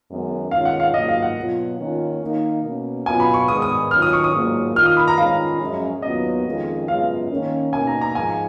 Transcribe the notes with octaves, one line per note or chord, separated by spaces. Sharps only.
F#2 D#3 G#3 B3
D#3 G#3 C#4 F4 F5
F#5
F5
G#2 D#3 F#3 A#3 F4 D#5
F5
F#5
B2 F#3 B3 F4
D#3 A#3 C#4 F4
D#3 A#3 D#4
B2 A#3 C#4
B2 F#3 B3 F4 G#5
B5
C#6
G#2 D#3 G#3 B3 D#6
D#6
D#3 F#3 C#4 F4 F6
D#6
C#6
D#6
G#2 F#3 A#3 F4
D#3 A#3 F4 F6
D#6
B5
A#5
D#3 G#3 C#4 F4 F5
F#2 F3 G#3 C#4
D#2 D#3 F#3 B3 F4 D#5
F2 D#3 G#3 C#4 F4
F#2 C#3 G#3 B3 F4 F5
D#3 A#3 C#4
B2 A#3 D#4 G#5
A#5
A#5
G#2 F3 G#5